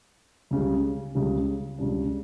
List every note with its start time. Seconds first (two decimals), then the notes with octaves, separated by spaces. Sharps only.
0.51 C#2 C#3 G3
1.15 C#2 C#3 G3
1.79 C#2 C#3 G3 D4